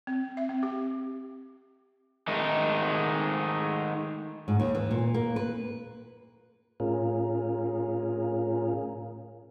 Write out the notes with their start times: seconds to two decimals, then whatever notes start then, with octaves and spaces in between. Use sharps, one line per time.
0.07 C4
0.37 E5
0.49 C4
0.63 G4
2.28 D#3 G#3 A3 D#4
4.48 G#2
4.60 D#2
4.75 E3
4.91 A#2
5.14 A#3
5.36 B4
6.80 A2 C#4 F4 G#4 A#4